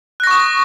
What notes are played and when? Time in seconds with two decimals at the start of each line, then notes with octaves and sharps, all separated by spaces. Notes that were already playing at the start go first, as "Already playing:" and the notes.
0.20 F#6
0.24 A#6
0.27 C#6
0.31 D#6